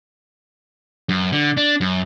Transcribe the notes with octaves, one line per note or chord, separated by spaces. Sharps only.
F#2
D3
D4
F#2